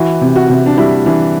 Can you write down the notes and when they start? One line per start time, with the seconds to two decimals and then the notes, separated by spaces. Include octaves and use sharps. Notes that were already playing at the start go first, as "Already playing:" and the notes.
Already playing: E3 F#4
0.21 C3
0.36 F#4
0.50 C3
0.66 D4
0.78 G3 E4
1.06 E3 D4